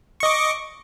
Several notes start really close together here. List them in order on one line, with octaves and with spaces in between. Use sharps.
C#6 D#5 D6